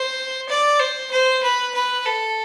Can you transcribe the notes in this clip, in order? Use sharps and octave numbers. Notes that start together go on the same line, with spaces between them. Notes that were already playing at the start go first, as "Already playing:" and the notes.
Already playing: C5
D5
C5
C5
B4
B4
A4